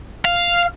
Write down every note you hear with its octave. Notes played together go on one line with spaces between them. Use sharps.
F5